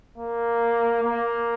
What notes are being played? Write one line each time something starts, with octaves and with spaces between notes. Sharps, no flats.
A#3
A#3